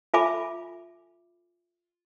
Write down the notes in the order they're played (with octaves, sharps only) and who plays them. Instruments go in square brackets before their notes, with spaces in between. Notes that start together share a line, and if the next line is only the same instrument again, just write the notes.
[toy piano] F4 A4 E5 G#5 B5 D6